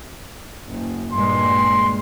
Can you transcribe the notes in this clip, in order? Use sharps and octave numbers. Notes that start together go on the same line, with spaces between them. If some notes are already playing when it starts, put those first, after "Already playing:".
F#1
G2 A#2 G#3 C6